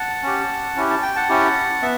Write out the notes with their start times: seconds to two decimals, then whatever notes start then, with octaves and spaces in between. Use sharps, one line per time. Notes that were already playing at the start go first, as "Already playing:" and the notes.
Already playing: F#5 A5
0.23 C#4 G4
0.76 C#4 E4 G4
0.90 A5
1.02 G5
1.16 F#5 A5
1.29 C#4 E4 G4
1.82 B3 E5